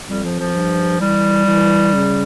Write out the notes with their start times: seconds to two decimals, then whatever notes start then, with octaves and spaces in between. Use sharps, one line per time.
0.09 F2 G3
0.24 F3
0.39 F3
0.55 G2
1.00 E3 G3
1.47 E3
1.93 C#3